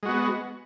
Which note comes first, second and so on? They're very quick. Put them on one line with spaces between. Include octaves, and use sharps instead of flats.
G#3 F#4 B3